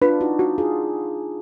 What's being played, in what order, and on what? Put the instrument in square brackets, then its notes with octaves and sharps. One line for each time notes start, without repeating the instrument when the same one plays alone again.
[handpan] D4 F4 [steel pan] B4
[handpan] D#4 F#4
[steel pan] F#4
[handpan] F4 G#4